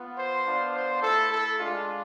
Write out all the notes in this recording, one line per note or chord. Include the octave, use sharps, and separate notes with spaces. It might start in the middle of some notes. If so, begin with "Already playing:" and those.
Already playing: B3 F4
C5
B3 D4 F4
C5
A3 E4 A4
A4
G#3 D4 F4